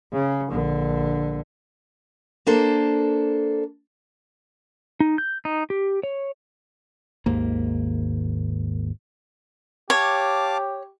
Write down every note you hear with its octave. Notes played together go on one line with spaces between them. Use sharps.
C#3
A#1 D3
A#3 D4 A4 C5
D#4
G6
D#4
G4
C#5
G#1 D#2 G#2 A#3
G4 C#5 F5 A5 D6